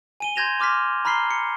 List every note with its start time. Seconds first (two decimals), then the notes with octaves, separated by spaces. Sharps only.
0.20 G#5 D#7 G7
0.36 C6 G6 G#6 A#6 E7 F7
0.60 C6 D6 F6 A#6 B6
1.05 A#5 B5 F6 B6 C7 G7
1.31 C#7